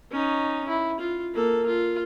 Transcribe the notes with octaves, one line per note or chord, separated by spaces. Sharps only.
C#4 D#4
E4
F4
A#3 A4
F4